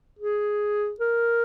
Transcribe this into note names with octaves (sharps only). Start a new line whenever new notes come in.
G#4
A#4